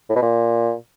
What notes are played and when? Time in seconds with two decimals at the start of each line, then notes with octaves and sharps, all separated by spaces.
0.09 A2
0.16 B2
0.22 A#2